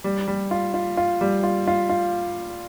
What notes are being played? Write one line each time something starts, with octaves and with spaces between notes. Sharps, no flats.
G3
G3
F4
F4
F4
G3
F4
F4
F4